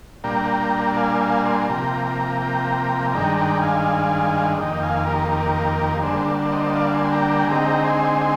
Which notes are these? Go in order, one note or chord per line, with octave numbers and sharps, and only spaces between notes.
A#2 G3 A#3 D4 G5 A#5
F5 G#5
F5 G#5
G#5 C6
C3 F3 A#3 G5 A#5
G5 A#5
G5 A#5
G2 D#3 G#3 D4 G5 A#5
G5 A#5
F5 G#5
F2 D#3 A#3 D#5 G5
F5 G#5
G4 A#4
G4 A#4
D3 G3 A#3 D4 G#4 C5
C5 D#5
D#5
D5 F5
G#5 C6
G5 A#5
G5 A#5
G#5
D3 G#3 C4 D#4 G5 A#5
G#5 C6